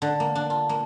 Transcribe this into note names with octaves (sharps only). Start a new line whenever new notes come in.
D3
A#3
D4
F4
A#3